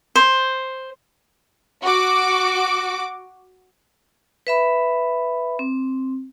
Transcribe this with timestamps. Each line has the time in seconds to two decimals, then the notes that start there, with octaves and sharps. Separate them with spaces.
0.15 C5
1.83 F#4 D6
4.47 B4 E5 B5
5.59 C4